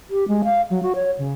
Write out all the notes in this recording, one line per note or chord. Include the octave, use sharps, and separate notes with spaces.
G4
G#3
F5
F#3
F#4
C#5
C#3